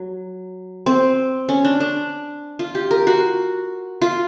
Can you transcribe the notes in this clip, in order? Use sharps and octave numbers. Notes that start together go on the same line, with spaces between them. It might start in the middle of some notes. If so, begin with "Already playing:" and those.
Already playing: F#3
C4
C#4
D4
D4
F4
G4
A#4
F#4
F4